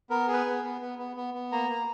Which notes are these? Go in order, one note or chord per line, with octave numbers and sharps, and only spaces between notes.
B3 A#4
G#4
B4
B3
B3
B3
B3
B3
B3
A#3 A#5
A#3